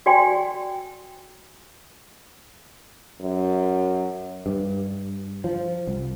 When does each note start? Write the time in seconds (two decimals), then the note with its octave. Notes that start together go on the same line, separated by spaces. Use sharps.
0.06 F#4 D5 G5 G#5 C6
3.20 F#2
4.46 G2
5.44 F3
5.87 C2